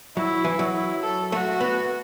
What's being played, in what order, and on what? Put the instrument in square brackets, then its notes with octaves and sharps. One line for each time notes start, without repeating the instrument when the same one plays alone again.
[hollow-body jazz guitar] F#3 [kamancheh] E4
[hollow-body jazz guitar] E3
F#3
[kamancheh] E4
A4
[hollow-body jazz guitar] A3 [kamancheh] F#4
[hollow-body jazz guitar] B3